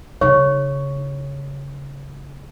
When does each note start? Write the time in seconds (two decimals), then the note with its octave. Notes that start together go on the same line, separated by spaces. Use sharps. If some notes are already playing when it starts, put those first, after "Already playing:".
0.21 C#3 D#4 C#5 C#6